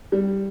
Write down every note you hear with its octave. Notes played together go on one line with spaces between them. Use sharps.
G3